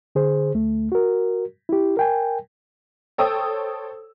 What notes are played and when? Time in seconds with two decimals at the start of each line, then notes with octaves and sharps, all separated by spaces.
0.15 D3 G#4 C5
0.54 D2 A3
0.92 F#4 A#4
1.69 E4 G4
1.97 A#4 G5 G#5
3.18 A4 C5 C#5 G5 D#6 E6